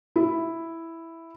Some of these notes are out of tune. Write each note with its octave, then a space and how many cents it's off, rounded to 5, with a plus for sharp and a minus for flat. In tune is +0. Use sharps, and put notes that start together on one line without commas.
E4 +0